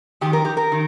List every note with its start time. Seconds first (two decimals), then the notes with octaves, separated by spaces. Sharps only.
0.21 D#3 G4
0.26 F2
0.33 A#4
0.45 G4
0.57 A#4
0.72 D#3